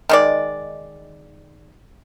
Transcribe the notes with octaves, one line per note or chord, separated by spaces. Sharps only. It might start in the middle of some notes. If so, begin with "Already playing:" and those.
D#3 G#3 D5